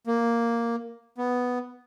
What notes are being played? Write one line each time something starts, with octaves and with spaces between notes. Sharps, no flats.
A#3
B3